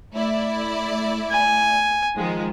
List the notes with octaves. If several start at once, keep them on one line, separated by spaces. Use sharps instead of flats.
A3 E4 D5
G#5
D#3 F3 G#3